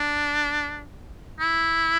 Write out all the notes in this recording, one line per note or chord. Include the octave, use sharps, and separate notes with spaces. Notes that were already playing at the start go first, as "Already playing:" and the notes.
Already playing: D4
E4